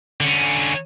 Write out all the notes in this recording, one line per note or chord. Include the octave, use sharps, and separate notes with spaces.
D3 C#4